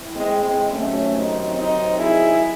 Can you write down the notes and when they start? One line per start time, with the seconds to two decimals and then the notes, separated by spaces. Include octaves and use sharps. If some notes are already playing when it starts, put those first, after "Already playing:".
Already playing: A2 E3
0.15 G#3 C4
0.43 G#3 C4
0.71 C3 D#3 F#3 A3 C#4
1.13 C4 D#4
1.55 C4 D#4
1.97 E4 G#4